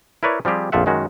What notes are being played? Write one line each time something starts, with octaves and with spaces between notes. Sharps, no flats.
E4 A#4 B4 C#5 D5
F3 G3 C4 G4 G#4
A#1 F2 F3 F4 E5 F#5
F#2 D#3 G#3 C#4 F#4